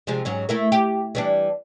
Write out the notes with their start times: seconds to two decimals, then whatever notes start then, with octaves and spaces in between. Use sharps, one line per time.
0.07 C3 F3 G#3
0.25 G#2 F#3 C#4
0.49 A3 E4 A#4
0.72 G4
1.15 E3 G3 D4